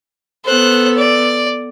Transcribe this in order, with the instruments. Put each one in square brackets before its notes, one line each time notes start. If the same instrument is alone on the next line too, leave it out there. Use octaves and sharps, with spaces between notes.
[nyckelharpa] B3 A4 [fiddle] C5 F#6
[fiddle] D5